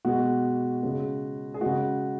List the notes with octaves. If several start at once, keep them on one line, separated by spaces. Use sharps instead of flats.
B2 G#3 F#4
C#3 G#3
G#4
C#3 G#3 F#4